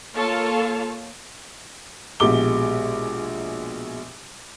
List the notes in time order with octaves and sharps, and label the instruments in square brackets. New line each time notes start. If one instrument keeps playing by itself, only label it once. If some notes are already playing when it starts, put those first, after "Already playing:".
[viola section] A#3 F4 A4 C#5 F5 A5
[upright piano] A#1 B2 G#3 G4 D6 G7